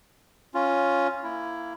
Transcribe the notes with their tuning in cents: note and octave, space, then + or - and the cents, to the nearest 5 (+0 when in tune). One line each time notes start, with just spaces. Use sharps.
C#4 +0 F4 +0
A#3 +0 E4 +15